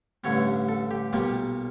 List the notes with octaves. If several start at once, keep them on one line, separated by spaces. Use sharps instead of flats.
A1 G2 D3 G3 C#5
A4
G4
B1 A#2 G3 A#3 G4